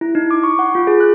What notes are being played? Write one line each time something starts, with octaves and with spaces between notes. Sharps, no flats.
E4
D#4
D6
C#6
F#5
F4
G#4
F#6